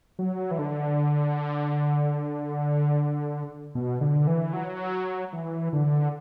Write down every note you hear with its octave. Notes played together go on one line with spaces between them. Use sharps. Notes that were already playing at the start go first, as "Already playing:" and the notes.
F#3
E3
D3
B2
D3
E3
F#3
E3
D3